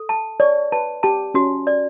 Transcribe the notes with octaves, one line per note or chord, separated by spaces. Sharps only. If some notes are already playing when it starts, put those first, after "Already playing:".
Already playing: A4
A5
C#5 D5
B4 A5
G4 A5
C#4 F#4
D5